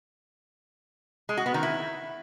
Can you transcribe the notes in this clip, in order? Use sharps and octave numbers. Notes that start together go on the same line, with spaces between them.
G#3
F#4
B3
D#3
E4